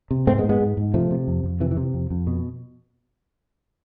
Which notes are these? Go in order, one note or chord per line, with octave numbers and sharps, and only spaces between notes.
C3
G#2 A3 C4
G#3 B3
G#2
G#3 B3
G#2
G#2
C3 F3 A3
C3
F2
F2
C3 E3
E3
C3
F2
F2
B2